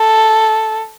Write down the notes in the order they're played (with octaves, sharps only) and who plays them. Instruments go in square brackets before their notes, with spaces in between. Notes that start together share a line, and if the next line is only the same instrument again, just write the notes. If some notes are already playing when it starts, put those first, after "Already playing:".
Already playing: [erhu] A4